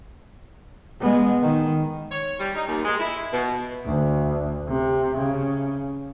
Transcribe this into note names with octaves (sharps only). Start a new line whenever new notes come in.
G#3 B3
D#3
C#5
G3
D#4
D#2
G#3
E4
B2
D2
C3
C#3